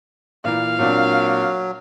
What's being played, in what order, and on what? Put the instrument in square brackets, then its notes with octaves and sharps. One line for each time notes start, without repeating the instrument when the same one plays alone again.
[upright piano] A#2 E3 A#4 [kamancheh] F5
[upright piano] A#2 C4 D4 [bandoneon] F#3